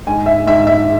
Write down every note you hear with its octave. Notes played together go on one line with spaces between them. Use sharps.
G#2 G#5
E5
G#2 E5
E5